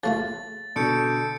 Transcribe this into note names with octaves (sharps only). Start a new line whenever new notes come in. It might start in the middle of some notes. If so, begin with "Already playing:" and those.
C#3 A3 F4 A6
B2 D3 A4 G6 C#7 D7